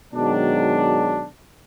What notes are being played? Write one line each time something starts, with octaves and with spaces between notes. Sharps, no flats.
B2 D#3 F#3 G#3 D4